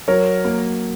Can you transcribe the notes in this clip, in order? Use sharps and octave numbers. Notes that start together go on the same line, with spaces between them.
F#3 A#4 C#5
A#3